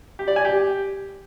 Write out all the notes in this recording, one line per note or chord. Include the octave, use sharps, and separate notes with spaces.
G4
D5
G#5
G4